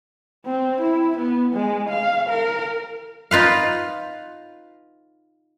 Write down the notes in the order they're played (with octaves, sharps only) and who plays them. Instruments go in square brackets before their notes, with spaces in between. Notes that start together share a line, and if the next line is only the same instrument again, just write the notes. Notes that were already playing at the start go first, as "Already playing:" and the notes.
[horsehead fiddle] C4
E4
B3
G#3
F5
A#4
[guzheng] D#4 F4 B4 F5